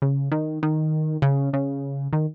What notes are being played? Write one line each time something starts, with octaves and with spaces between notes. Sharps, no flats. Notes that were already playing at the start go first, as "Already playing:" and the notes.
C#3
D#3
D#3
C#3
C#3
D#3